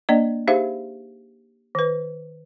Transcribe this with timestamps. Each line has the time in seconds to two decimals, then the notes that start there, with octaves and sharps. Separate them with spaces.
0.09 A#3 D4 D5 D#5
0.48 D#4 G4 G#4 C5 E5 F5
1.75 D#3 B4